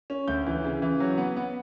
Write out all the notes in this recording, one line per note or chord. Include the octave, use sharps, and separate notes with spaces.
C#4
D2 G6
E3
C#3
E3
F#3
B3
B3